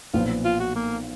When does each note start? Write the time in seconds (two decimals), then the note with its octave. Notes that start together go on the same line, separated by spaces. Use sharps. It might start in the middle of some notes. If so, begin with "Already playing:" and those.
0.13 B1 A#2 F3 B3 F4
0.45 F4
0.60 F#4
0.75 A#3